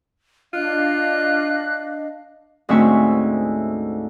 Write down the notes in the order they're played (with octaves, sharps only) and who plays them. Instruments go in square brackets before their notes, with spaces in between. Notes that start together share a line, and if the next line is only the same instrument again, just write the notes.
[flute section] D4 D#5 F5 [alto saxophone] F4 [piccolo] F#6
[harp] D2 G#2 C4 C#4 E5 C#6